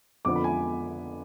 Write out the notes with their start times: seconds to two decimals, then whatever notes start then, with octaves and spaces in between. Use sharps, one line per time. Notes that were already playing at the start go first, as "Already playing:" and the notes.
0.25 F2 D3 F3 B3 D6
0.36 B5
0.44 G#5